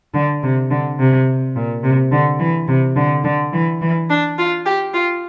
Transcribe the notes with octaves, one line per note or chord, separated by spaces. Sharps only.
D3
C3
D3
C3
A#2
C3
D3
E3
C3
D3
D3
E3
E3
D4
F4
G4
F4